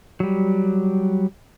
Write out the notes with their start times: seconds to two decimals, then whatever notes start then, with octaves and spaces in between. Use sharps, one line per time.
0.20 F#3 G3